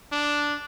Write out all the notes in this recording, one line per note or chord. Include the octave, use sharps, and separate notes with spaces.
D4